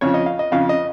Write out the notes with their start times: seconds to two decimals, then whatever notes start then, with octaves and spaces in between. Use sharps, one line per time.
0.01 F2 C#3 F3 C#5
0.14 D#5
0.26 F5
0.39 D#5
0.52 F2 C#3 F3 F5
0.69 D#5